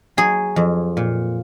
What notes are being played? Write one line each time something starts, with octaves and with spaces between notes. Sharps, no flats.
F#3 G#4
F2
A#2